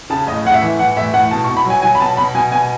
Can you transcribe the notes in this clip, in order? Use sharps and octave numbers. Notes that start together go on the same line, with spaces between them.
C#3 A5
A2 D#5
A2 F#5
E5
E3
E3 F#5
A2 E5
A2 F#5
B2 A5
C#6
B2
B5
F#3
G#5
F#3 G#5
B5
B2 A5
B2 B5
B2 G#5
B2 G#5